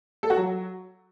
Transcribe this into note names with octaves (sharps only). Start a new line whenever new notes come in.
A4
F#4
F#3